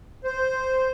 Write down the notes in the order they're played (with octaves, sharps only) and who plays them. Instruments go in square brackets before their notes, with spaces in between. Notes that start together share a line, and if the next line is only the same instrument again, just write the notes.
[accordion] C5